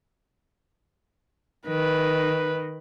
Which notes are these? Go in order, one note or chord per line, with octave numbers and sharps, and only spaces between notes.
D#3 B4